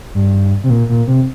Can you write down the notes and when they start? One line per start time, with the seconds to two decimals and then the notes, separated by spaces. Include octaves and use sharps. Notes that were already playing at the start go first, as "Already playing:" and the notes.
0.15 G2
0.64 C3
0.70 A#2
0.89 A#2
1.07 C3